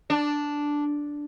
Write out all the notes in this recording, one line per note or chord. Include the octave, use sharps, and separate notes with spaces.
D4